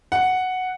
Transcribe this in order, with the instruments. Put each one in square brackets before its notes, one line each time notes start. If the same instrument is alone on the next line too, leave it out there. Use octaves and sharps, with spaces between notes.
[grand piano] F#5